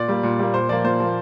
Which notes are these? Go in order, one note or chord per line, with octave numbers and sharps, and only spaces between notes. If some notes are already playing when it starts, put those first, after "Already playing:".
Already playing: A#2 D5
G3 A#3
A#2
G3 A#3
A#2 C5
F3 A#3 D5
A#2 C5
F3 A#3